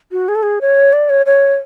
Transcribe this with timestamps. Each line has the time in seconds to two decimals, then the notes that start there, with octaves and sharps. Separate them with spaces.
0.12 F#4
0.28 G#4
0.35 A4
0.43 G#4
0.61 C#5
0.93 D5
1.10 C#5
1.26 C#5